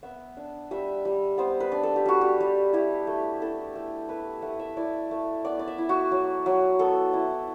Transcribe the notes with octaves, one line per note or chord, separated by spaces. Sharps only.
B3 E5
D4
G3 E5
G3
B3 C5
B4
D4
A4
G4
G3 F#4
G4
G3
E4 G4
A3
E4 A4
A3
E4 B4
A3 F#5
E5
E4 D5
A3
B3 D5
D5
E5
E4
F#4
F#3
F#3
B3 A4
E4